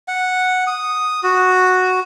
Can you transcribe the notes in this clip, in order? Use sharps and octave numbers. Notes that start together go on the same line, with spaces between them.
F#5
D#6
F#4